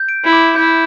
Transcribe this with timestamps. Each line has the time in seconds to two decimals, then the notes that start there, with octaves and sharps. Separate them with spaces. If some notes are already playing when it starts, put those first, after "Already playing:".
Already playing: G6
0.09 D7
0.24 E4
0.33 D6
0.56 E4 G6